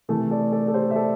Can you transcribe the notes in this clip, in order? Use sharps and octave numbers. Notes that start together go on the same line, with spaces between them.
C3 E3 A3 A4
A4 D5
A4 D5
A4
G4 C5
E5
A4 D5